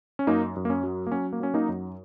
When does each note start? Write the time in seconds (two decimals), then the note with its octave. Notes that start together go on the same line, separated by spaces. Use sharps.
0.19 C#4
0.27 F#2 A#3 D#4
0.56 F#2
0.65 A#3
0.70 C#4
0.84 F#3
1.07 A#3
1.12 F#3 C#4
1.33 A#3
1.40 F#3 C#4
1.54 A#3 D#4
1.69 F#2